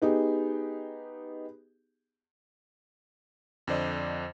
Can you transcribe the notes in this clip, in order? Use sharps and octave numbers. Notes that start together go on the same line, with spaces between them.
B3 D#4 G4 G#4
F2 D3 C5 D5 D#5